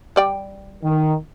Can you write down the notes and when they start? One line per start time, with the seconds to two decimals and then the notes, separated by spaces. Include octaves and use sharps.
0.16 G3 D5 G5
0.82 D#3